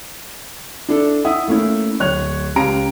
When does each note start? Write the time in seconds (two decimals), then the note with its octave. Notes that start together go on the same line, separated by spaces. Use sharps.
0.88 D4 E4 A4
1.25 E4 E5 F#5 D#6
1.48 A3 A#3 C#4 E4
2.00 D1 C#5 F#6 F7
2.56 C#2 C#4 G4 F5 A#5 D7